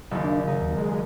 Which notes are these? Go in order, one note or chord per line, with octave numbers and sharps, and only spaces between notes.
F#1 D#2
D4
C#3 D#4
D#2
G#3